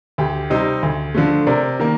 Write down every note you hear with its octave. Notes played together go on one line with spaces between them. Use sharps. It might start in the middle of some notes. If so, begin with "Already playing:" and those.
D2 G4
C3 G3 C4 D#4
D2
D3 F3 A3
C3 A#4 D5
D#3 A#3